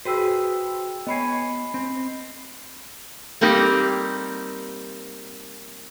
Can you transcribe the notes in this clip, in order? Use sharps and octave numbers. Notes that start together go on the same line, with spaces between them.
F#4 G#4 B4 C5 G5 E6
B3 C#5 D#5 G#5 B5 C7
C4
G3 A#3 C4 D#4 G4